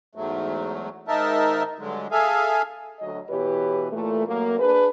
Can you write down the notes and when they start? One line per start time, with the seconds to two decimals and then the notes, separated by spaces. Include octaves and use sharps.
0.15 E2 G#2 F#3 A3
1.08 G#2 D#3 D#4 A#4 E5 A5
1.79 G2 D3 F#3 G#3
2.12 G#4 A4 E5 F5 G#5
3.00 D2 F#3 D#5
3.29 B2 E3 G4 B4 C#5
3.92 A#2 E3 A3
4.26 F#2 A#3
4.59 D4 G#4 B4